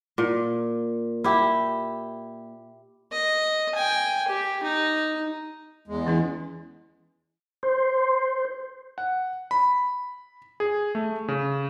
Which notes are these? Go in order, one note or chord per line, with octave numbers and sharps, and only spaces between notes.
A#2
E4 G4
D#5
G5 G#5
G4
D#4
E2 G#3
E3 C#4 E4
C5
F#5
B5
G#4
A3
C#3